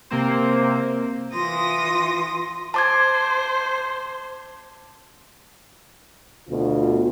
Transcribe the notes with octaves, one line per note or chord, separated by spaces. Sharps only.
C3 A#3 C4 C5
E3 F4 C6 D#6 A#6
C5 A5 D6 G#6
D2 B2 F4